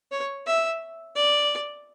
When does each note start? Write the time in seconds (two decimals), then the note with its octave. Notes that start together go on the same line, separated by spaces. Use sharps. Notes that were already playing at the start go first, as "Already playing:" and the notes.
0.12 C#5
0.47 E5
1.15 D5